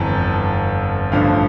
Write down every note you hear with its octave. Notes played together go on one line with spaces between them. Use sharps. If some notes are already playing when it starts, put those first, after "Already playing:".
Already playing: G1 F2 E3 A5 A#5
A1 G2 D3 F3 F5